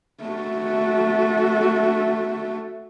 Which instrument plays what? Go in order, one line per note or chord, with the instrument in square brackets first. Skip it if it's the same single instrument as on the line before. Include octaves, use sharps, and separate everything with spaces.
[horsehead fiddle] A3 F#4